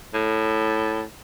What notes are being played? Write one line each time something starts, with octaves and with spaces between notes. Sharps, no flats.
A2